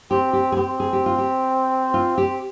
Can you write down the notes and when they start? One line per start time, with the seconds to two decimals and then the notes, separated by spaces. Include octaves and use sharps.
0.11 C4 G4
0.33 G4
0.52 G#4
0.57 C4 G4
0.80 G#4
0.93 G4
1.06 F4
1.19 G4
1.94 F4
2.18 G4